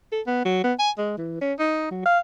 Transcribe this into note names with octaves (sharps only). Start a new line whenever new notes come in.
A4
B3
F#3
B3
G#5
G#3
E3
C#4
D#4
F#3
F5